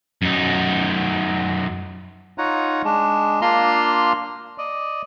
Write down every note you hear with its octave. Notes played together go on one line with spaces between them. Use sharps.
F#2 D#4
D#4 F4 C#5 F#5 A#5
G#3 D4
A#3 D4 F4 A#5 C6
D5 D#5